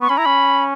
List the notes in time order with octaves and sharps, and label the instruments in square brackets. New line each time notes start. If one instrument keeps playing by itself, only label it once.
[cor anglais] B3 [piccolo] C#6
[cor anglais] C#4 [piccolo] B5
[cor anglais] E4 [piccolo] A#5
[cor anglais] C#4 [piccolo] B5